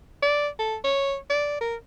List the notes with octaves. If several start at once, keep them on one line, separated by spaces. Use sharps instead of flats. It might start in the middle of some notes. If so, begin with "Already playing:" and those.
D5
A4
C#5
D5
A#4